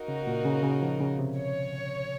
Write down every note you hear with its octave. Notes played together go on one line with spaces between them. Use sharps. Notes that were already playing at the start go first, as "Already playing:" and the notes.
Already playing: A#3 D#4 F#4 A#4
C#3
A#2
C#3
C#3
F3
C#3
C3
C#5